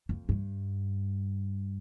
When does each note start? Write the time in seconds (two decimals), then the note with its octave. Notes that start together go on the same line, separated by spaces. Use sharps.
0.09 F2
0.29 G2